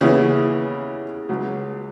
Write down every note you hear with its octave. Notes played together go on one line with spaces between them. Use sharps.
D#2 C#3 E3 B3 E4
C#2 C#3 F#3